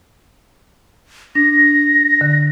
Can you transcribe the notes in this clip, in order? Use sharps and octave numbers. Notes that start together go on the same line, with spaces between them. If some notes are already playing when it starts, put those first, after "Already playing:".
D4 A#6
D3